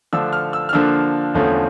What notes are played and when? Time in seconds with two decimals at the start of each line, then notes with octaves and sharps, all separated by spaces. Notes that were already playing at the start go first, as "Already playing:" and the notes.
0.13 D3 F3 A3 D4 E6
0.33 F6
0.53 E6
0.69 F6
0.73 D3 F3 A#3 D4 E6
1.34 E2 D3 F3 A3 C#4